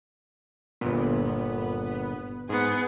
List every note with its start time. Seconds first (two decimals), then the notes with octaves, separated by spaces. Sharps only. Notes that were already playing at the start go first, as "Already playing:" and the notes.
0.81 G1 A#2 B3
2.49 G#2 B3 G#4